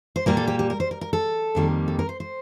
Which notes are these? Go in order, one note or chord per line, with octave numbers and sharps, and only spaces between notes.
C5
A#2 G3 A#3 A#4
A4
G4
G4
A#4
C5
A#4
A#4
A4
F2 D#3 G3 A#3
A4
A#4
C5
C5